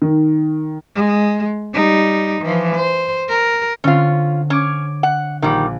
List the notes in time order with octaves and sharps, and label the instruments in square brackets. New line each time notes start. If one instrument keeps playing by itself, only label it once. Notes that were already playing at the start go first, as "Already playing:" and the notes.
[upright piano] D#3
[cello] G#3
G3 D#4
E3 F3
C5
A#4
[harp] D3 C4 [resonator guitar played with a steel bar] C#4 F4
[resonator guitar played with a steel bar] C#4 [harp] D6 G#6
[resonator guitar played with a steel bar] F#5
[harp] A#1 [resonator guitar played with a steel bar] D#3 G3